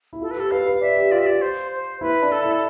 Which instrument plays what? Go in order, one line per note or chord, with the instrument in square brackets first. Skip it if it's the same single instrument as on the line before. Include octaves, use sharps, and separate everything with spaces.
[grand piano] E4
[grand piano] F4 [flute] A4
[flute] B4
[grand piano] G4 [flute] A4
[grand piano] B4 [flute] F5
[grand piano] B4
[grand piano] D5 [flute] E5
[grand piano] G4
[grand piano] F4 [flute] D5
[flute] E5
[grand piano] F4 [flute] D5
[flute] C5
C5
[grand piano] E4 [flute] B4
[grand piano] D4
[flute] A4
[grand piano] E4